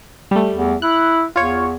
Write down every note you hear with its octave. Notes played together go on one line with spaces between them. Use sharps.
G3 A3
E2
E4 F#6
E2 F4 C#5